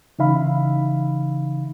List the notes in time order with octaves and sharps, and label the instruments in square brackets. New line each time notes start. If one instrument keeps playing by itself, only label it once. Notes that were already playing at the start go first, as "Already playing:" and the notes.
[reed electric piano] C#3 E3 D#4 E5 F5 B5